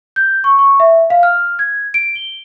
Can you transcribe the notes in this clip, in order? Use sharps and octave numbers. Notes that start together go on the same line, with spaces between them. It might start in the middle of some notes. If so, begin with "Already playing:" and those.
G6
C#6
C#6
E5
F5
F6
G#6
D7
G7